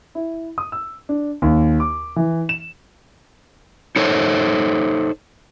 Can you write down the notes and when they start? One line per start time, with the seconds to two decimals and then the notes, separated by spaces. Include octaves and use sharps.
0.15 E4
0.58 D#6
0.72 E6
1.09 D4
1.42 D#2
1.80 D6
2.16 E3
2.49 E7
3.96 D#4 A4 C5 C#5